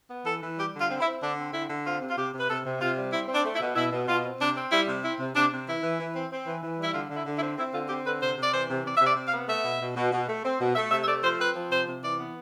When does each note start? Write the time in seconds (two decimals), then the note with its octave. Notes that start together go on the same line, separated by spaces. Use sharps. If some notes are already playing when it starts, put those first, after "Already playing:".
0.10 B3
0.25 E3 A4
0.42 E3
0.58 G3 G4
0.74 D3
0.79 F4
0.90 C4
1.00 E4
1.05 C4
1.21 D3 D4
1.37 C4
1.53 D3 E4
1.69 D3
1.85 C4 F4
2.00 C3
2.09 F4
2.17 C3 G4
2.33 C3
2.39 B4
2.49 C3 A4
2.65 C3
2.80 C3 F4
2.97 G3
3.12 C4 E4
3.28 C4
3.34 D4
3.44 A3
3.55 E4
3.60 B2
3.75 B2 E4
3.91 B2
4.08 B2 F4
4.24 C4
4.39 C3 D4
4.55 C4
4.71 G3 E4
4.87 C3
5.02 C4 E4
5.19 C3
5.35 C3 D4
5.51 C3
5.67 E3 E4
5.82 E3
5.99 E3
6.14 C4
6.31 C4
6.46 E3
6.62 E3
6.78 G3 E4
6.94 D3 F4
7.09 D3
7.15 E4
7.26 D3
7.37 E4
7.42 C4
7.57 C4 E4
7.73 D3 F4
7.89 C4 G4
8.05 D3 B4
8.21 C3 C5
8.37 C3
8.42 D5
8.52 E3 C5
8.69 C3
8.84 C3 D5
8.96 E5
9.01 C3 D5
9.16 C3
9.27 F5
9.33 B3
9.48 A3 E5
9.64 B2
9.81 B2
9.96 B2
10.12 B2
10.28 A3
10.44 C4
10.60 B2
10.75 A3 E5
10.91 C3 E5
11.03 E5
11.07 A3 D5
11.23 F3 C5
11.39 C4 B4
11.55 F3
11.71 C3 C5
11.87 C3
12.03 E3 D5
12.18 B3